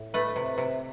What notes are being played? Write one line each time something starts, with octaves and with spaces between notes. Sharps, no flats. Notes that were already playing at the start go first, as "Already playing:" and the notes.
Already playing: A2
A3 B4
C3
C3